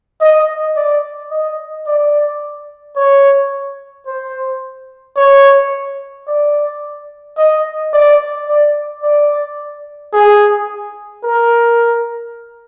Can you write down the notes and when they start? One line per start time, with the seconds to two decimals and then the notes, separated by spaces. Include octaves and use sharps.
0.21 D#5
0.76 D5
1.31 D#5
1.87 D5
2.96 C#5
4.07 C5
5.17 C#5
6.27 D5
7.38 D#5
7.93 D5
8.48 D5
9.03 D5
10.13 G#4
11.24 A#4